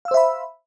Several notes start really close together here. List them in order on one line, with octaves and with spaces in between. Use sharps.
F5 E6 C5 E5 B5